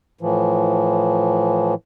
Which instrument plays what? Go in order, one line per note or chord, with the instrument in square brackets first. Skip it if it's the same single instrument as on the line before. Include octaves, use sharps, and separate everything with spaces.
[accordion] A2 E3 F3